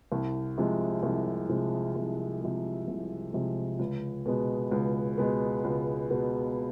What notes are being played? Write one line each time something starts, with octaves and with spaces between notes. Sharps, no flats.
C2
C3 F3 G#3
C2
C3 F3 G#3
C2
C3 F3 G#3
C2
C3 F3 G#3
C#2
B2 G#3 B3
C#2
B2 G#3 B3
C#2
B2 G#3 B3